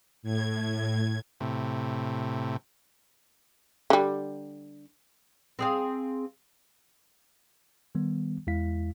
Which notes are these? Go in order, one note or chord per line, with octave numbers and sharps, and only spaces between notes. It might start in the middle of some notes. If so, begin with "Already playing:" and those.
A2 G#6
A2 C3
D3 G3
C4 G#4 F5
D#3 G3 B3
E2 G#3 E4 F5 B6